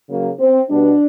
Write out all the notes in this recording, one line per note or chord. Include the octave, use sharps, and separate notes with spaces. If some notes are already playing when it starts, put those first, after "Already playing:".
C#3 F#3 A#3
C4
B2 G3 B3 D4